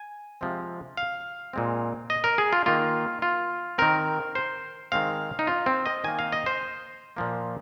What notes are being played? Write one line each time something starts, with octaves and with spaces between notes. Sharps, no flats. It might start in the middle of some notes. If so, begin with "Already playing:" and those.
Already playing: G#5
C3 F3 G#3 C4
F5
A#2 G#3 C4
D#5
A#4
G#4
F4
D#3 A#3 F4
F4
D#3 C4 A#4
C5
D#3 G#3 C4 F5
D#4
F4
C4
D#5
D#3 A#3 G#5
F5
D#5
C5
A#2 F3 A#3